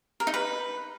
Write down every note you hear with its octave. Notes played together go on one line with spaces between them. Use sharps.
A#4
D#4
B4